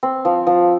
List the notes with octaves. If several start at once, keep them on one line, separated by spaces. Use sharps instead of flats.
C4
F3
F3